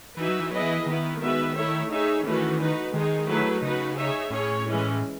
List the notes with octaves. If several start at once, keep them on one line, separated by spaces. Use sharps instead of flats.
E3 D#4 F#4 B4 E5
F#3
E3
F#3 B3 E4 G#4 B4 D#5
E3
D#3 B3 E4 B4
G#3 B3 F#4 B4 E5
A3 E4 A4 C#5 E5
D#4 G#4 C#5 E5
D#3 E3 A3 C#4 F#4 B4
D#4 F#4 B4
D#3 G#3 D#4 G#4
F#3 A3 E4 G#4 B4
C#3 D#4 F#4 B4
D#4 G#4 C#5 E5
A2 C#4 G#4 C#5
E3 G#3 C#4